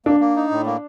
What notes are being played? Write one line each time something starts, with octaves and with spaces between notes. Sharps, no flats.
A#3 D4
A#3
D#4
A2
A#3